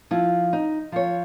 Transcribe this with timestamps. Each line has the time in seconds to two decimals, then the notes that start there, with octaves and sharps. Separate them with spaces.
0.11 F3 E4
0.53 D#4
0.92 F3 C#5